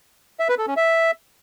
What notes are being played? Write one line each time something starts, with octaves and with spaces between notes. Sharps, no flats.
E5
B4
A4
C#4
E5